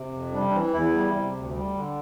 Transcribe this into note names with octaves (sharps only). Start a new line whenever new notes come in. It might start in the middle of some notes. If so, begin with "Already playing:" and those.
Already playing: C3
F2
G3 D4
D4
E3 C4
E2 E4
G3
C3
D2
G3
D3